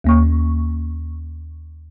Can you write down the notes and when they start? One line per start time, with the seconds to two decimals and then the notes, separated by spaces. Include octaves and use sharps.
0.04 D#2 A#3 C#6